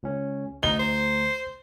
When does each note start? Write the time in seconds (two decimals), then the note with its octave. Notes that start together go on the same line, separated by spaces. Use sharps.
0.03 C#2 C#4
0.63 D2 D#4 A#5 G7
0.79 C5